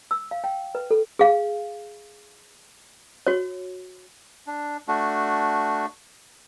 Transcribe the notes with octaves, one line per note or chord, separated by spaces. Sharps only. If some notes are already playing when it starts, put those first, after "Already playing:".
E6
F5
G5
B4
A4
G#4 F5
F#4 C#5
D4
A3 D4 F#4